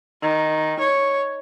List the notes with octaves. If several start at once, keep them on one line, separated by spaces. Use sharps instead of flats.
D#3
C#5